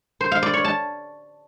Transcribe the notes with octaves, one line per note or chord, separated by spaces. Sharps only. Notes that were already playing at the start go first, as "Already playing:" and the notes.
C5
F5
D5
C#5
A5